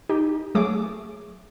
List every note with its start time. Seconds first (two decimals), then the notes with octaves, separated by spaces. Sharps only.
0.09 D#4 G4
0.55 F#3 A3 G#4 D6